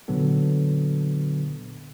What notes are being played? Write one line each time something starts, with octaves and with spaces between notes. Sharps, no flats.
A#2 D3 F#3 B3 A4